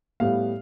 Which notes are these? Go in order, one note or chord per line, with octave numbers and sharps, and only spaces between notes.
A2 G3 B3 F5